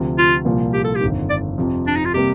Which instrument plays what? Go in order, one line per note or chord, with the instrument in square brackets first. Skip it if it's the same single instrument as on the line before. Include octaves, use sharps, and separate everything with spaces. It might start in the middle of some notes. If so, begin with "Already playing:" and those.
Already playing: [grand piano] D2 C3 F3
[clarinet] F4
[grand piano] C2 A#2 F3 A#3 F4
[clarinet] G4
A4
G4
[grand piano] G1 F2 D#3
[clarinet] D5
[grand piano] F2 C3 F3
[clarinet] D4
D#4
F4
[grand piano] C3 G3 A#3 [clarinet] G4